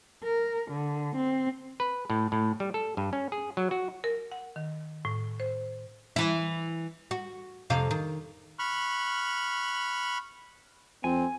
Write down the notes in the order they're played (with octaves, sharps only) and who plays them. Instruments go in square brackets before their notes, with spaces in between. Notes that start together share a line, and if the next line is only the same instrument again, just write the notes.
[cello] A#4
D3
C4
[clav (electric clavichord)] B4
A2
A2
G3
A4
G2
C#4
G#4
F#3
F#4
[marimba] A#4
F#5
D#3
A2
C5
[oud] E3 E4
F#4
F2 C3 F5
D#3
[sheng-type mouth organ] B5 C#6 F6 F#6
[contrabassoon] F2 [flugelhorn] C4 [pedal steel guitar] G#5